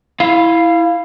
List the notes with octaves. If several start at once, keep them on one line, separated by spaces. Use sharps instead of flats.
E4 F5